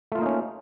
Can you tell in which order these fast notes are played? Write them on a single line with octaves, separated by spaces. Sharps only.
A3 F4 A#3 D#4 C#4